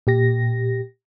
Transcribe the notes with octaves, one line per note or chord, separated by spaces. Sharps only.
A#2 G4 A#6